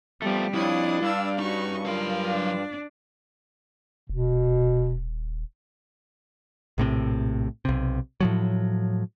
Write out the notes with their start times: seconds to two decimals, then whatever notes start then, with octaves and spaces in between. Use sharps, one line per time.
0.22 F3 G3 A3 B3
0.54 F2 D4 E4 C#5 D#6
1.02 G2 F5 E6
1.39 C#4 D#4 F#4 C#6
1.86 F#3 F4 A#4 F5
2.25 D4
4.09 D#1 B2
6.78 A#1 A2 C3
7.65 B1 C3
8.20 A2 F3 F#3